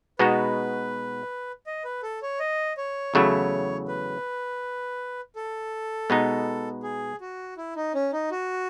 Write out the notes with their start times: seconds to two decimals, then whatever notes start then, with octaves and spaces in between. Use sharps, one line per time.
0.19 B2 G#3 B3 D#4 F#4 B4
1.67 D#5
1.84 B4
2.03 A4
2.22 C#5
2.40 D#5
2.77 C#5
3.14 E2 C#3 F#3 A3 E4
3.88 B4
5.36 A4
6.10 B2 G#3 B3 D#4
6.83 G#4
7.21 F#4
7.57 E4
7.76 D#4
7.94 C#4
8.13 D#4
8.31 F#4